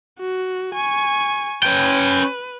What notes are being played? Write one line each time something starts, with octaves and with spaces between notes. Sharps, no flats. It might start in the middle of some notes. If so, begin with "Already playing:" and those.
F#4
G#5 C#6
C#4 B4 G5